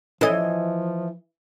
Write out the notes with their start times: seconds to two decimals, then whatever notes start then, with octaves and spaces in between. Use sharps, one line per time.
0.21 E3 F3 C#4 A4 C#5 D#5